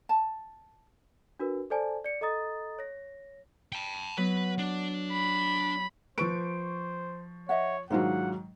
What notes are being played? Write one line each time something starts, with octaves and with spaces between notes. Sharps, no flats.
A5
D4 F#4 A#4 B4
A4 C5 D5 G#5 A5
D5 C#7
A4 D#5 A#5 D#6 A6
C#5 A#6
G5 A5
F#3 B3 B4
D4
B5
F3 B4 C5 C#6 D7
C#5 D#5 E5 F#5
G#2 D#3 F#3 D4 F4 C5 F#5